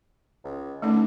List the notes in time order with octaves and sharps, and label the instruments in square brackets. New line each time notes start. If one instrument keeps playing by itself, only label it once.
[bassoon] C#2
[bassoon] D3 [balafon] A3 C#4 D#4